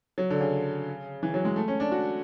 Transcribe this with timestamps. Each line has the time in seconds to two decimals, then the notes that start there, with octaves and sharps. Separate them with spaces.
0.18 F#3
0.30 D3
0.41 C#3
1.23 E3
1.34 F#3
1.45 G#3
1.56 A3
1.68 C#4
1.80 D4
1.92 F#4